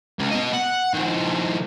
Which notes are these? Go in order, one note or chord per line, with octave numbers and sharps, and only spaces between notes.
C#2
B2 D#5
F#5
D#3 F3